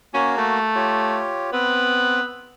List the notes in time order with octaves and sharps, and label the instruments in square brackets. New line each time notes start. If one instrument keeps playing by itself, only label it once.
[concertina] A#3 F#4 [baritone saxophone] C#4
[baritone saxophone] A3
[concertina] F4 G4 C#5
[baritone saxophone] B3 [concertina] C4 B4